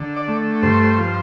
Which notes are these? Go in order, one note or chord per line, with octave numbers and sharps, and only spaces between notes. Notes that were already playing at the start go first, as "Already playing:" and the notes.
Already playing: D3
D5
A3
G2 C5
F3